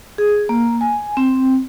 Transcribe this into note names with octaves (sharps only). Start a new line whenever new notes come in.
G#4
A#3
G#5
C4